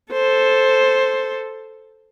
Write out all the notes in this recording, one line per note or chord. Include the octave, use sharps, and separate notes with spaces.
A4 C5